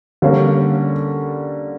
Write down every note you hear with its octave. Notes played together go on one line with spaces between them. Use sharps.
D3 G3 A#3 C#4